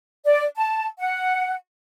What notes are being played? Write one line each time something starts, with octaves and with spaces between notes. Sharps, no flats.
D5
A5
F#5